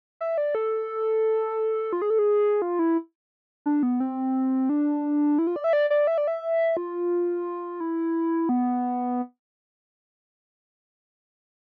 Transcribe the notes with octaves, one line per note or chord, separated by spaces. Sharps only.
E5
D5
A4
F4
G#4
A4
G#4
F4
E4
D4
B3
C4
D4
E4
F4
D5
E5
D5
D5
E5
D5
E5
F4
E4
B3